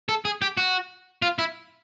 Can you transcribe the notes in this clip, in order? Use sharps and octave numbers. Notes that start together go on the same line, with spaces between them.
A4
G#4
G4
F#4
F4
E4